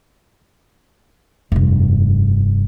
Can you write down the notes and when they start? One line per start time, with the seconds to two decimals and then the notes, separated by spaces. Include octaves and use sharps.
1.52 F1 G2